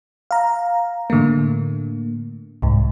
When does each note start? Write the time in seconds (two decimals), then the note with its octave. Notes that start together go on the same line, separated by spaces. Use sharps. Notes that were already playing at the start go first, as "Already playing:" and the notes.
0.31 F5 A#5
1.10 A2 D3 A3 A#3
2.62 C2 G#2